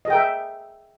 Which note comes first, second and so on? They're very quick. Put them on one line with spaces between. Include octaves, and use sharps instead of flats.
D#5 G#4 G5 A#4 E5